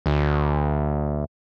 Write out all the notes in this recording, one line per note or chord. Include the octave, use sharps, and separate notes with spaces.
D2